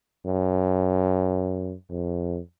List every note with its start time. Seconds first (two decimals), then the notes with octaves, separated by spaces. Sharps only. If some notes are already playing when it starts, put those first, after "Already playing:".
0.26 F#2
1.90 F2